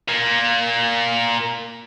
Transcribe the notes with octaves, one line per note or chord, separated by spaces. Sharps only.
A#2 A#3